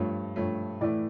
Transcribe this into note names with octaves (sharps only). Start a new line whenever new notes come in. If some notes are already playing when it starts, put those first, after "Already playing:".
Already playing: G2 F3 A3 C#5
G2 F3 A3 C#5
A2 E3 A3 D5